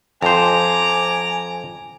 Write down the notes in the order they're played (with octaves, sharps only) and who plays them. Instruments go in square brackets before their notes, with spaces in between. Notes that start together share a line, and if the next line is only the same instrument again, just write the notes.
[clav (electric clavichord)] F2 C5 [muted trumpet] G#5 [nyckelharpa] A#5 D6